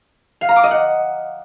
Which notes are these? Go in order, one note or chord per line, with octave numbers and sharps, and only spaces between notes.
F5
A#5
D6
D#5
F#5